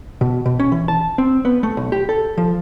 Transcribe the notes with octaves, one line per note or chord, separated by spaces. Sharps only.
B2
B2
C#4
E3
A5
C4
B3
A3
B1
G4
A4
F3